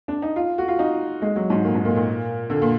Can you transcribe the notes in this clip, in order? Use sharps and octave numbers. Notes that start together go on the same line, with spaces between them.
D4
D#4
F4
F#4
F4
D#4
G#3
F#3
G#2
A#2
G#2
A#2
A#2
D3
A#2